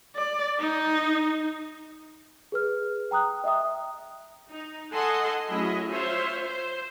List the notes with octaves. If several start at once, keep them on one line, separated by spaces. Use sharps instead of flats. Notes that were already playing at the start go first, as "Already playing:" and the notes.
D5
D#4
G#4 B4 F6
G5 A#5 D#6 F#6
D#5 E5 G5 D#6
D#4
A4 D#5 F#5 G#5 C6
F#3 A3 C#4 E4 G#4 D#5
F4 C5 C#5 E5
C5